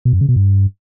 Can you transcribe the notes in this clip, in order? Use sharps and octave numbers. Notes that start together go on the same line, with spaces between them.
B2
F#2
C#3
B2
G2